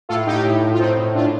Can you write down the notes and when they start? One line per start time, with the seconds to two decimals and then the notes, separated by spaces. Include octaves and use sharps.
0.09 A2 F4 A4
0.27 A2 D#4 G4
0.44 A2
0.62 A2
0.73 F4
0.79 A2 C4 D#4
0.98 A2
1.15 A#2 D4 F4